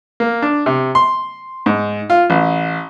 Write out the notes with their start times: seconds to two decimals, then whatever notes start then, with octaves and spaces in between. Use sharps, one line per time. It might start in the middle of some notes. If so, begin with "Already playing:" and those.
0.20 A#3
0.42 D4
0.66 C3
0.95 C6
1.66 G#2
2.10 F4
2.30 A1